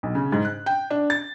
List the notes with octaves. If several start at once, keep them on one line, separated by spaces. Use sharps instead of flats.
B1
C#3
G#2
F#6
G5
D4
A6